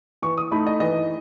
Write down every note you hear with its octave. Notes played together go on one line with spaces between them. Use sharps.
E3 C#6
D#6
A3 D#4 B5
D#5
E3 D#5